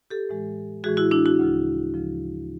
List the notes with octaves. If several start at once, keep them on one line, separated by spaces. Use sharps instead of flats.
G4 A4
A2 E3 G#3
A2 E3 G#3 F#4 G#4
E4 F#4
D4 E4
E4 F#4
D2 C#3 F3
D2 C#3 F3